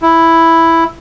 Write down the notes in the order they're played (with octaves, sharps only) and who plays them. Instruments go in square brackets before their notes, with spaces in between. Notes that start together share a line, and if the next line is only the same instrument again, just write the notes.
[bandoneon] E4